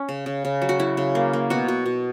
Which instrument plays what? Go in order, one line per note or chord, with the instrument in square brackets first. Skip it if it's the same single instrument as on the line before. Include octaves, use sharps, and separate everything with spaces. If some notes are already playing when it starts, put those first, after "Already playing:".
Already playing: [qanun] C#4
C#3
C#3
C#3
F#3
F#4
F#3 E4
C#3
A#3
A#3
B2 F#4
B2
B2